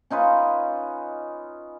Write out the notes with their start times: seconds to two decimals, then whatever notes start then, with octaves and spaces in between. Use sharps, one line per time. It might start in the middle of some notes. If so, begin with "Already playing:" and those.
0.10 C#4 D#4 F4 B4